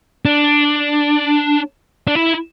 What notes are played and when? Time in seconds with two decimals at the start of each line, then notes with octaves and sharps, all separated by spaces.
0.25 D4
2.08 D4
2.15 E4